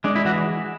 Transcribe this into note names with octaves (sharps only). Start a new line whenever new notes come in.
G#3 D4
E4
E3 F#4